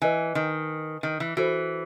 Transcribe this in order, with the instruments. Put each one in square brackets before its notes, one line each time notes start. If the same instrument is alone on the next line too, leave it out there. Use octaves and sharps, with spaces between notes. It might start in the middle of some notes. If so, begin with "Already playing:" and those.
[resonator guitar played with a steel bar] E3 [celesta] B4 D#5 G#5
[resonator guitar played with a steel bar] D#3
D#3
E3
[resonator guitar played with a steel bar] E3 [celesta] F#4 A4 C5